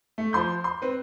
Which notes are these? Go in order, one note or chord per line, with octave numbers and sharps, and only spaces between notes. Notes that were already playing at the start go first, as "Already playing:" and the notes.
A3
F3 C6 G6
C6
C4 B4